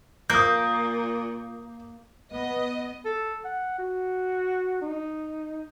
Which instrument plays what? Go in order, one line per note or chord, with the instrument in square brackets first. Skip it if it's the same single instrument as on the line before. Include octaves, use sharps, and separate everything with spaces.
[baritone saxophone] A#2 [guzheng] A#3 [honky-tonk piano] D#6 G6
[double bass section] B3 [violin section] D#5
[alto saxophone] A4
F#5
F#4
D#4